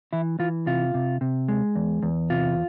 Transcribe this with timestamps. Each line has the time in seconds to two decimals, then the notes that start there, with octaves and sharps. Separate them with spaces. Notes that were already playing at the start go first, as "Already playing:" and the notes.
0.13 E3 E4
0.39 E3 F4
0.67 C3 F4
0.94 C3
1.21 C3
1.49 G#3
1.75 E2
2.02 E2
2.30 C3 F4